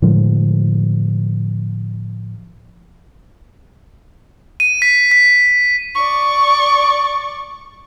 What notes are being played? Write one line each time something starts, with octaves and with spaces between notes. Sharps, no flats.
A2 D3 F3 G#3
D#7
B6
B6
D5 C#6